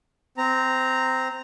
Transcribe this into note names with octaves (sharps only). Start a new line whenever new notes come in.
C4 A#5